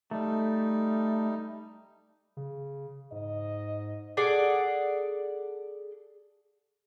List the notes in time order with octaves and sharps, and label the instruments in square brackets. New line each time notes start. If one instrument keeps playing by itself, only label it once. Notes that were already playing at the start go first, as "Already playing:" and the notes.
[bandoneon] G3 D#4 [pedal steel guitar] A3
[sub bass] C#3
[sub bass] G#2 [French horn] D#5
[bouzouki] G#4 A4 D5 F#5